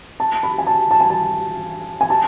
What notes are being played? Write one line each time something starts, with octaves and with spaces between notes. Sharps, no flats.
A5
B5
G#5
A5
A5
G#5
A5
G#5
A5